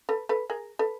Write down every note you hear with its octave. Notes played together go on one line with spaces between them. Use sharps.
A4 B4
A4 B4
G#4 A#4
A4 B4